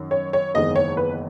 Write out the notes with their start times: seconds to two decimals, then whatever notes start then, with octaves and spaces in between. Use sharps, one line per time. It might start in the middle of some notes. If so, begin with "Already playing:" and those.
Already playing: F#2 D#3
0.11 C#5
0.33 C#5
0.54 F#1 E2 D#3 G#3 D#5
0.76 C#5
0.97 B4